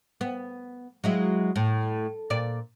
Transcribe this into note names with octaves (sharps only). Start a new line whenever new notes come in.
B3
F#3 G#3 E4
A2
A#2 D5